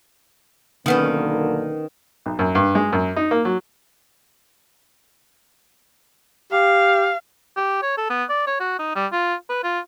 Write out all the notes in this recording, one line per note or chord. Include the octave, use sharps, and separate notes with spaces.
B1 D3 D#3 A#3 B3 C#4
B1
F#2
G2
G#3
F#2
D#4
A#3
F#3
G4 F5
G4
C#5
A4
B3
D5
C#5
F#4
D#4
G3
F4
B4
F4